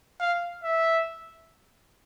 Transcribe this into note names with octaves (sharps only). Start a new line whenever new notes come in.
F5
E5